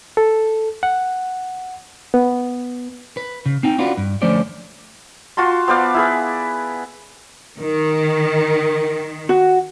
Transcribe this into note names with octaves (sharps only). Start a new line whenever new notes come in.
A4
F#5
B3
B4
C#3
C4 D#4 G5
C#4 D4 F4 F#4 B4
G2
D3 F3 A3 C#4 C5 D5
F4 F#4 A5 C6
B3 C5 D5 F5
E4 G#4 B4
D#3 A#4
F#4